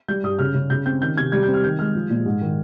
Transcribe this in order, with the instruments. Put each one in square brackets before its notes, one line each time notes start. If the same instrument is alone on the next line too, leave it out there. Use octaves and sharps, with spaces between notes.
[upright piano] G3 G6
G2 D#6
C#3 F6
C#3
C#3 G6
C4 G6
D#3 G6
C3 G#6
G3 G#6
G6
C4
F6
D#3 G6
G#3 F6
F3
A#2
G#2
D#3